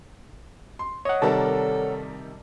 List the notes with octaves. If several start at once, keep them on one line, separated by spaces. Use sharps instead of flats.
C6
C#5 D#5 F#5
C3 D#3 G3 A4 A#4 D5 A5